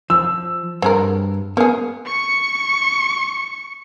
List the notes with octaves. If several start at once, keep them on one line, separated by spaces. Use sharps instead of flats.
F3 E6
G2 C4 G#4 A#4
A#3 B3 C#4 G#4
C#6 C#7